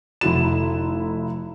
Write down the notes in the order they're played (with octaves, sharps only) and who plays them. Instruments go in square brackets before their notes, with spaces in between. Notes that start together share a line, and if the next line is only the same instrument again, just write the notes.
[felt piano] F1 E4 F#4 E7